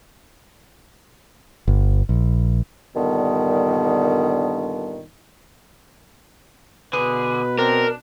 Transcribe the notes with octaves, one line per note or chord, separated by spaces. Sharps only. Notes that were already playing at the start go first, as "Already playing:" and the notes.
G1
A#1
G2 A#2 D3 D#3 G3 B3
B2 D3 G#4 B4
C4 D4 A#4